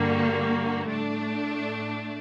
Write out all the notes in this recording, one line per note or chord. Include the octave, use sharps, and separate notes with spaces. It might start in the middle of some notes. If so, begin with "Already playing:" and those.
Already playing: G2 D3 G3 A#3 F#4
A2 A3 D4